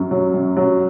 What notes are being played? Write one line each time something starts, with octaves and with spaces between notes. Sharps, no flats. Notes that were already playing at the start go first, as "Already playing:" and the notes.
Already playing: F#2 F#3
F#3
F#2
F#3